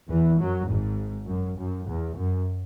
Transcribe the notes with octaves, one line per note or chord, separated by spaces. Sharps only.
E2 E3
F#2 F#3
G#1 G#2
F#2
F#2
E2
F#2